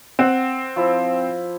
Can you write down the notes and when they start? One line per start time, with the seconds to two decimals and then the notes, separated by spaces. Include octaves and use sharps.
0.19 C4 F#5
0.76 F3 E4